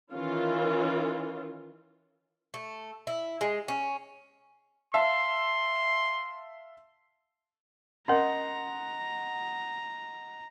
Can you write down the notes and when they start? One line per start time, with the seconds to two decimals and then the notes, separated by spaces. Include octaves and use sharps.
0.12 D#3 E3 C#4 F4
2.54 A3
3.07 E4
3.41 G#3
3.68 C#4
4.94 E5 F5 A5 C6
8.08 C#4 A#4 D#5 F#5 A#5 C6